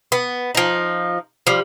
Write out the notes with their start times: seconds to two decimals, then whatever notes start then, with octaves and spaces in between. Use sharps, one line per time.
0.12 B3
0.55 F3 D#4
1.47 F3 G3